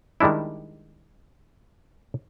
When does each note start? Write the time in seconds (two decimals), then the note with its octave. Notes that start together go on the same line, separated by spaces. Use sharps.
0.20 D#3 G3 G#3 D4 E4